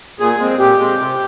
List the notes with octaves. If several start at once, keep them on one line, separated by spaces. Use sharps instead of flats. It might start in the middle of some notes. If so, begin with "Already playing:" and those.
A#2 G#4
G#3 C4
A#2 G4
G#3 C4
C3